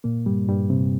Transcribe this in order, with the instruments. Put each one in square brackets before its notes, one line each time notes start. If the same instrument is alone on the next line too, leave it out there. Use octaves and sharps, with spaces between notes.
[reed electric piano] A#2 A#3
G2 G3
G2 G3
C3 C4